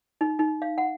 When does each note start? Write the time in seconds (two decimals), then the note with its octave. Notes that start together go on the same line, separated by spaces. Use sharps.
0.21 D#4
0.39 D#4
0.62 F5
0.78 F#5